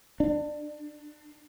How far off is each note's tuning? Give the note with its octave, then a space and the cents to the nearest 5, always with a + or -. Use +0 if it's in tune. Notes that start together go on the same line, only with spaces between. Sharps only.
D4 +25